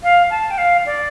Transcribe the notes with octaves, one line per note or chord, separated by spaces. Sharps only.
F5
A5
G5
F5
D5